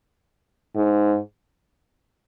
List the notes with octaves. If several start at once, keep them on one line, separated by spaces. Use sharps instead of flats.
G#2